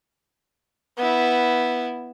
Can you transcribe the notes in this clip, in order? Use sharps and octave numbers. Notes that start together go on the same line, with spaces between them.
B3 E4